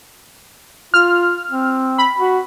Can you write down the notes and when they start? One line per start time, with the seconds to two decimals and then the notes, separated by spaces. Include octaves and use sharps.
0.94 F4 F6
1.51 C4
1.98 B5
2.17 F#4